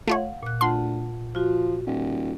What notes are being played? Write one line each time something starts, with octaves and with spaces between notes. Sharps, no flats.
A3 F4 C#5 F5 F#5
A#2 F#6
D2 F4 F#5 A5 C6
F3 F4 F#4
D#1